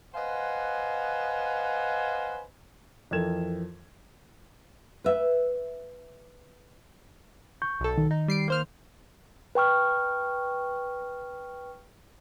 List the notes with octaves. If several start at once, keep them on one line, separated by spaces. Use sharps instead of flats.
B4 C5 D#5 F5 F#5 G#5
F2 E3 A4 A#4 G#6 E7
B4 E5
C#6 G6
B1 A4
D#3
D#4
G3 C7 D7
A#3 C5 F6
B4 G5 C#6 F6